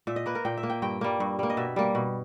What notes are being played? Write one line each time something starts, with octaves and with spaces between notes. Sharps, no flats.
A#2 E5
D#5
A#3 B4
A#4
A#2 G5
E5
A#3
G5
G2 G5
G3 A#3
G2
G3 A#3
D#5
B2 E5
G3 A#3
B2